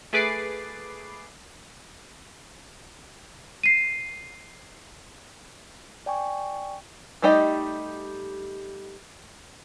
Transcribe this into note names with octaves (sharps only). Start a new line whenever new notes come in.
A3 G#4 B4 D6 A6 C7
C7 D#7
D5 G5 G#5 C#6
G3 A3 D#4 G4 D#5